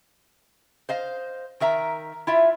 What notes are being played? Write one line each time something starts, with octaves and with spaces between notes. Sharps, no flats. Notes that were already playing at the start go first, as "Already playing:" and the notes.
C5 D#5 F5
D#3 A#4 E5 A#5
E4 F4 E5